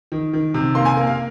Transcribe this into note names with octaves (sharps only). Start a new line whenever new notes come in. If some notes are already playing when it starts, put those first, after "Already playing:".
D#3
D#3
C3
A#3 C6
G#5
A#3
F5